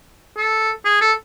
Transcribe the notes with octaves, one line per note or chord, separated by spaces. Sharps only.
A4
G#4
A4